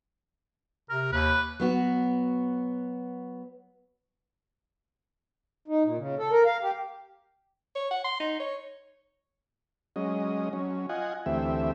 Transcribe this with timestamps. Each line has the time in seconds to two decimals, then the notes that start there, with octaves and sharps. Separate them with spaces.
0.90 C3 A#4
1.12 D#2 B4
1.60 F#3 B3 F#4
5.68 D#4
5.85 A#2
5.98 C#3
6.19 A4
6.31 A#4
6.45 F5
6.62 G4
7.75 C#5
7.91 F#5
8.04 C6
8.20 D#4
8.40 C#5
9.96 F#3 G#3 C#4 D#5
10.53 F#3 C#4
10.89 F4 D#5 F#5 G#5
11.26 D2 E3 A3 C4 G4 E5